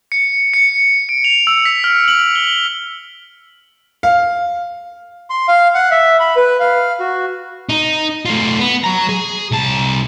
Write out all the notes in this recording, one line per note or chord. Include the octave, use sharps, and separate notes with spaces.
C#7
C#7
D7
F7
E6
B6
F6
F#7
G7
F5
C6
F5
F#5
E5
B5
B4
F5
F#4
D#4
A3 F4
B3
F#3 A#5
G#4
C2 A5